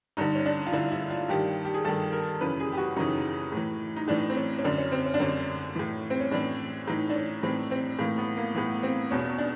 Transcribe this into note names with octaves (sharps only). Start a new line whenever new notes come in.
G2 D3 D#4
C#4
D4
F4
G2 D3 E4
E4
F4
G2 D#3 G4
G4
G#4
G2 D#3 A4
A#4
F#2 C#3 E3 B4
G#4
G4
F#4
F#2 C#3 E3 D#4
A2 E3
D#4
A2 E3 D4
C4
C#4
C#4
F#2 D3 D4
C#4
C4
C#4
D4
F#2 D3 C#4
A2 E3
C4
C#4
A2 E3 D4
A2 E3 D#4
D4
C#4
A2 E3 C4
C4
A2 E3 A#3
B3
A#3
A2 E3 B3
C4
E2 B2 C#4
D4